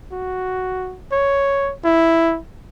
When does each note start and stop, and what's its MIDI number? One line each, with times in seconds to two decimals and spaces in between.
0.12 0.97 66
1.12 1.73 73
1.85 2.38 64